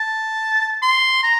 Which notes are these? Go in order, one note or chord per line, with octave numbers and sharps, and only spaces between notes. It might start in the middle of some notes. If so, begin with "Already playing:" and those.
Already playing: A5
C6
A#5